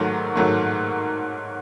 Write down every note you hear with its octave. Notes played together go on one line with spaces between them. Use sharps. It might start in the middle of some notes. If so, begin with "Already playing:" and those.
Already playing: G#2 D#3 F#3 A3
G#2 D#3 F#3 A3